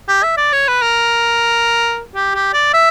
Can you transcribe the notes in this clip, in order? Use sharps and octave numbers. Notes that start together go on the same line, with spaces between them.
G4
E5
D5
C#5
B4
A#4
G4
G4
D5
E5